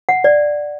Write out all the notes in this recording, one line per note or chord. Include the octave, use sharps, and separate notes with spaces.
F#5
D5